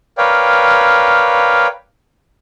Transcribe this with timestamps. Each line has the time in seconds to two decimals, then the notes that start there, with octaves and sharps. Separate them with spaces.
0.18 A#4 B4 C#5 D5 F5 G5